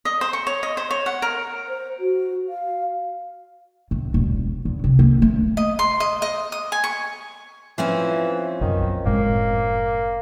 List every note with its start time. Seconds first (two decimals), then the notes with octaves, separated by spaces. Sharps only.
0.05 D#5
0.21 C5
0.33 C#6
0.47 C#5
0.63 D#5
0.77 C5
0.91 C#5
1.06 F#5
1.22 A#4
1.69 C5
1.99 F#4
2.49 F5
3.91 A2
4.14 E1
4.65 E2
4.84 C3
4.99 A#3
5.22 A3
5.57 D#5
5.79 C6
6.00 D#5
6.22 D#5
6.52 D#6
6.72 G#5
6.84 C#6
7.78 E3 F3 C4 C#4
8.61 B1 F#2 B2 D#3
9.05 F#1 A2 G#3 A#3